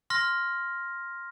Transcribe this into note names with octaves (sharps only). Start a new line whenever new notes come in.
C6 F6 A#6